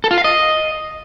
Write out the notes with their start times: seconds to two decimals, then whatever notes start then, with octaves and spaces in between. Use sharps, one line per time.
0.04 A4
0.11 F4
0.18 F5
0.24 D#5